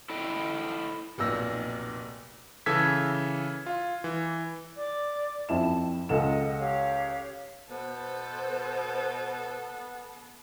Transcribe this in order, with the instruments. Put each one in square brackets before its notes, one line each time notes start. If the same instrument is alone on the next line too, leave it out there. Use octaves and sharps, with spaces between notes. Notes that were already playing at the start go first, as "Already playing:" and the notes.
[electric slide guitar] E4 A4 D#5 G5
[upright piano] F1 B1 A#2 E6 A#6
[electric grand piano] C#3 E3 A4 E6 G#6 B6
F4
E3
[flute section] D5 D6
[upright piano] F2 E4 E7 [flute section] A5
[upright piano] C#2 A4 E7 [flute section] D#5 F#5
[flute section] G4 C#5 F5
[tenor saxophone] B2 [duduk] B3 [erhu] A4 [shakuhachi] C5